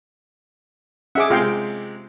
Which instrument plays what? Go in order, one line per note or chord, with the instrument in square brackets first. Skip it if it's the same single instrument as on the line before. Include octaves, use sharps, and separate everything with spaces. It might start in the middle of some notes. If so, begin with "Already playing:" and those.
[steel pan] C#4 G#4 D6 [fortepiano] E5 F#5
[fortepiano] C3 G#3 [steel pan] F4 F5 G5